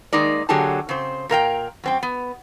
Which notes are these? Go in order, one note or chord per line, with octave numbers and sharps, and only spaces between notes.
D#3 G#3 A#3 D#4 D5
D3 F#3 A#3 G4 G#4 A5
C#3 C4 C5
A#2 A#4 F5 G5
F#2 C4 G5
B3